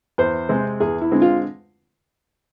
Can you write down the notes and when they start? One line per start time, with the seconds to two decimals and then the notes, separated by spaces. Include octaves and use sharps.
0.18 E2 C5
0.49 C3 G#3 C4
0.80 E2 G#4
1.01 E4
1.12 D3 G#3 C4
1.22 F4